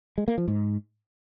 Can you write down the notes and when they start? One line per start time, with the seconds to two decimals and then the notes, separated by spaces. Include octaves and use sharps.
0.18 G#3
0.28 A#3
0.38 F3
0.48 G#2